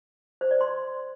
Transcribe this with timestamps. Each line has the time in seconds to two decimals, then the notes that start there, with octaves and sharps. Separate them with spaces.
0.41 C5
0.51 D5
0.61 C6